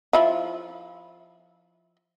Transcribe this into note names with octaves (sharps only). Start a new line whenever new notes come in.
F3 E4 F4